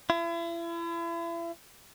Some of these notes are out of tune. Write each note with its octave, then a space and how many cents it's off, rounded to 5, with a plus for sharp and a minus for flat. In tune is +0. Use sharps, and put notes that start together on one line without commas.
E4 +40